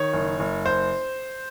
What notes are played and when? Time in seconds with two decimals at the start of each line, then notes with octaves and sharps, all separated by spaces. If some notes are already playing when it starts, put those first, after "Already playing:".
Already playing: D#3 C#5
0.13 F#1
0.40 F#1
0.66 C5